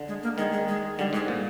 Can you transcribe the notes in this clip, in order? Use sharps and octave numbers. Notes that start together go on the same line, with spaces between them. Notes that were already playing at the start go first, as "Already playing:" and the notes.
Already playing: D3
G#3
A#3
D#3 G#3
G#3
G#3
D3 G3
G#2 G#3
A#2